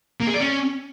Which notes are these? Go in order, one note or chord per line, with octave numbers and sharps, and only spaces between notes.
A#3
G#4
D5
C#4